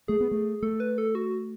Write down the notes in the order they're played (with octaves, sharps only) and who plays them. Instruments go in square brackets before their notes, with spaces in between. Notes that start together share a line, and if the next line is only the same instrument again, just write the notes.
[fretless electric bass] A3 [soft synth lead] G#4
[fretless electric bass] B3
A3
[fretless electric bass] A3 [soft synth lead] A4
[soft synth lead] B4
A4
F#4